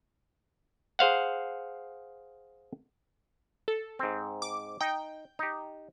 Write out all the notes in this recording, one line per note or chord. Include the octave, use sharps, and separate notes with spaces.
G#4 C5 F5 F#5
A4
G#2 C4
D6
D#4 G5
D#4 G4